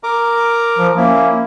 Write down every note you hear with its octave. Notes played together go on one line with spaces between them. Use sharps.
A#4 A#5 D6
F3
A#3 C#4 E4